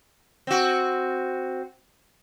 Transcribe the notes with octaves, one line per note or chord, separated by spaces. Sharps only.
C4 F#4